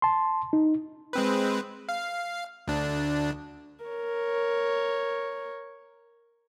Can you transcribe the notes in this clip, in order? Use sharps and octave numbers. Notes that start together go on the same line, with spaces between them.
A5 C6
D#4
G#3 C4 B4
F5
D2 D4
A#4 C#5